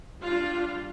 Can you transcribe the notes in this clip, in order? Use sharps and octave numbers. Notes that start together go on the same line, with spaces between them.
G3 D4 F4